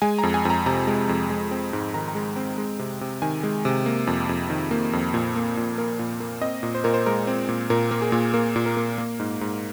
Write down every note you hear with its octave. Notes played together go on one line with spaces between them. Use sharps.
G#3 G#5
F2 A#5
G#5
F2 A#5
C3 A#5
G#3
F2
G#3
C4
G#2
D#3 A#5
A#5
G#3
C4
G#3
C3
C3
D#3 G#5
G#3
C3
A#3
F2
F2
D#3
A#3
F2
A#2
A#3
A#2
A#3 A#4
A#2
A#3
C4 D#5
A#2
C5
A#2 A#4
C5
G#3 A#4
C4
A#2
A#2 A#4
A#3
G#4
A#2
A#3 A#4
A#2
A#4
A#3
A#3
G#2
G#2